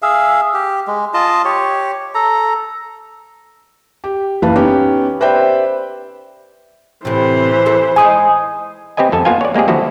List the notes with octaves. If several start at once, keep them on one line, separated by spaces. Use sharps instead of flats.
G#4 E5 F5
G4
G#3
F4 D#5 A5
G4 C#5
A4 A#5
G4
F#1 E3 B4 F5 A5
B3 C#4 D#4 G4
G4 B4 C5 D5 E5 G5
A2 C3 E3 C5
E4 G#4 A4
G#3 D#4 G#5 D#6
C4 G4 B4 D#5 G#5
F2 A4 G#5 A5
A#3 B3 F4 F5 G#5
C#5 D5
G#3 A#3 C4 G4 G#4
D3 E3 F3 E4 F#4 A4